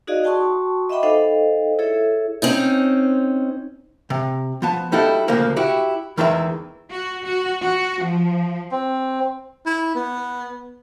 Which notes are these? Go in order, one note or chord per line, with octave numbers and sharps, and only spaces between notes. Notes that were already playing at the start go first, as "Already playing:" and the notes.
D#4 F#4 G#4 D5 D#5 F5
F#4 G5 A5 C6 C#6 D#6
D#5 E5 F#5 G5 B5 D6
D#4 A4 C5 D#5 F5 G5
E4 G#4 A4 C#5 E5
C4 C#4 D#4
C3
F3 B3 A5
G3 D#4 E4 F#4 A4
D2 A#2 C#3 F3 A#3
E4 F#4 G4
E2 D#3 E3 G#3 G#4 E5
F#4
F#4
F#4
F3
C4
E4
B3